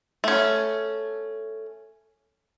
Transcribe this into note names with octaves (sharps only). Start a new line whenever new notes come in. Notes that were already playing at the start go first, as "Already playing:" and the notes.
A3 C#4